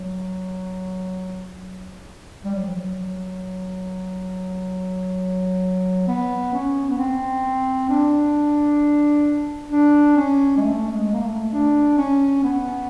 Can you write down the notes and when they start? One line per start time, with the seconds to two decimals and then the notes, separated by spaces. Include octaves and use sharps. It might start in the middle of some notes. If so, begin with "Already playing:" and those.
Already playing: F#3
2.45 G3
2.55 F#3
2.65 F3
2.75 F#3
6.07 B3
6.53 C#4
6.90 B3
6.99 C4
7.89 D4
9.71 D4
10.17 C#4
10.57 G#3
10.62 A3
10.93 G#3
11.12 A#3
11.23 A3
11.53 D4
11.98 C#4
12.44 B3